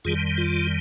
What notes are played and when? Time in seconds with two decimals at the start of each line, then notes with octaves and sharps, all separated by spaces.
0.05 F2 D#3 G3 F4 G#4
0.38 F4